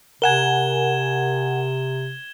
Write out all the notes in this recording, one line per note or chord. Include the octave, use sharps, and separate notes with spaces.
C3 A#4 F#5 G#5 G#6 E7 G7